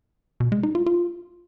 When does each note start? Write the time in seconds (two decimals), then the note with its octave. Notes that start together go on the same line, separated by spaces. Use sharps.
0.40 B2
0.52 G#3
0.63 D#4
0.75 F4
0.86 F4